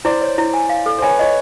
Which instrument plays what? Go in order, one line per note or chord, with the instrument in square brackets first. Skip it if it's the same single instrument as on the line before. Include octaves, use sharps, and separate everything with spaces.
[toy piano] E4 [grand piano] C5 D5
[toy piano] C#5
E4
G#5
F5
A4
[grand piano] C5
[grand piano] B4 C#5 [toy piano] G#5
[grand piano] C#5 [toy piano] D#5